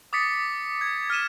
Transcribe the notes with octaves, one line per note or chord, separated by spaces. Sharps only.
D6 D#6 A6 B6 C#7
G#6
F6 B6 D#7 E7